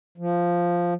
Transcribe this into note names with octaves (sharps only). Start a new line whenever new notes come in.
F3